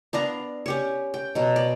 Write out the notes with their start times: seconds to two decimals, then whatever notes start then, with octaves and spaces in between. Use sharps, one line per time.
0.13 B3 D4 F5 A#5
0.66 C#4 G4 C#5
1.14 G5
1.35 B2 F#3
1.56 D5